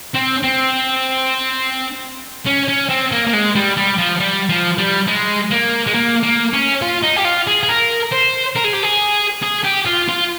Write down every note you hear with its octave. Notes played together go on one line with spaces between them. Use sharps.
C4
C4
C#4
C#4
C4
A#3
A#3
G#3
G3
G3
F3
G3
F3
G3
G#3
A#3
G#3
A#3
A#3
C#4
F4
D#4
G4
F4
G#4
G#4
A#4
C5
A#4
G#4
G4
G#4
G#4
G4
F4
F4